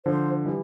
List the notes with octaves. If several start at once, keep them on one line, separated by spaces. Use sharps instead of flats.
D3 F3 C5
E3 G3